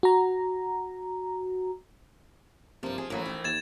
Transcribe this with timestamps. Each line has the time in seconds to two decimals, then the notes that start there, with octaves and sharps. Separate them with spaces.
0.03 F#4 A#5
2.83 G2 C3 F3 A#3
2.98 F3 G#4
3.10 A1 F2 E3 F#3 A3 A#3
3.26 D#3
3.44 D#2 G#6 A6 E7